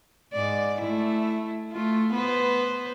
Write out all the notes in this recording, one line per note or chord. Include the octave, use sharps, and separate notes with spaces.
G#2 D5
A3 E4
A3 F4
B3 B4 C5